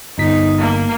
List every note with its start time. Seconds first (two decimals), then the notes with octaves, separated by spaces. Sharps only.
0.18 G1 D#4 B6
0.58 A#3